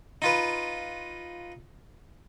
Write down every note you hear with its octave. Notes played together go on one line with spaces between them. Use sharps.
D#4 F4 B4